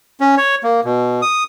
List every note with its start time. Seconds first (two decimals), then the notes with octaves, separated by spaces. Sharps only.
0.20 C#4
0.37 C#5
0.63 A#3
0.85 B2
1.22 D#6